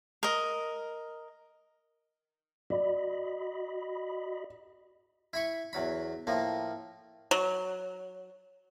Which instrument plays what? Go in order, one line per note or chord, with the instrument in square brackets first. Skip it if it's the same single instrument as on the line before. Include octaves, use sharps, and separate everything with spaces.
[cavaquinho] A#4 D#5
[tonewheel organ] F#4 D#5 B5 [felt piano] D5
[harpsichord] E4 B5 C#6
E2 F#3 B5
A2 F3 A#3
[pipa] F#3